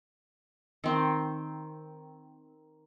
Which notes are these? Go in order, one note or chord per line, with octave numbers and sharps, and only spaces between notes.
D#3 C4